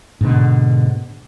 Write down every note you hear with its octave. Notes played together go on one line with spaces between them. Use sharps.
G#2 B2 D3